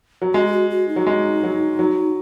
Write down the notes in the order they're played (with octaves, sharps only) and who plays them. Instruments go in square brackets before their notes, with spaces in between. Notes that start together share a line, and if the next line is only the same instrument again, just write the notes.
[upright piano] F#3
[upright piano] G#3 [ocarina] F#4
[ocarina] G#4
F#4
F#4
D#4
[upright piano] F#3
G#3
F#3
F#3